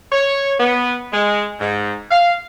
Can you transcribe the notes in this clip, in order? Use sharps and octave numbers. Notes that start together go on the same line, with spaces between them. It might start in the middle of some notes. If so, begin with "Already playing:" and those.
C#5
B3
G#3
G#2
F5